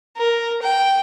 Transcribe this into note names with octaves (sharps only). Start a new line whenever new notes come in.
A#4
G5